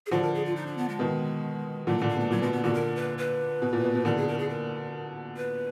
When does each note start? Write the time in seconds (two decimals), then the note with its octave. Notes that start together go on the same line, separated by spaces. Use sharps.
0.06 G#4
0.11 D3 F3 F#4
0.23 A#4
0.34 G#4
0.45 F4
0.56 D#4
0.67 D4
0.77 B3
0.89 G#3
0.99 B2 D#3
1.87 A#2 D3 F#3
1.98 A#2 D3 G#3
2.09 A#3
2.16 B2 G#3
2.30 A#2 F#3
2.42 B2 G#3
2.52 B3
2.63 A#2 D3 F#4
2.74 A#4
2.96 B4
3.18 B4
3.62 B2
3.73 A#2
3.84 B2
3.95 B2
4.05 A#2 D3 A#4
4.17 G#4
4.28 A#4
4.38 G#4
4.49 A#4
5.37 B4